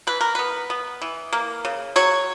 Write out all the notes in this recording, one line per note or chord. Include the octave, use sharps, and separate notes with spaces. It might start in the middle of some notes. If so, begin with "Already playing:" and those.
E3 B4
A#4
B3 B4
B3
E3
A#3
C#3
F#3 C#5